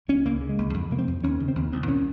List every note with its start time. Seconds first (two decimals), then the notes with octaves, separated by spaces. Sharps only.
0.08 C#2 C#4
0.25 C#2 A#3
0.41 C#3
0.49 G#3
0.58 C#2
0.74 F2
0.90 C3 A#3
0.99 C4
1.07 F2
1.24 D#2 C#4
1.40 C#3
1.48 C4
1.55 D#2
1.72 C2 C4
1.88 A#2 C#4